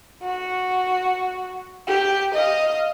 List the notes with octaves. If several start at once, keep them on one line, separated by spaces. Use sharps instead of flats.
F#4
G4
D#5 F5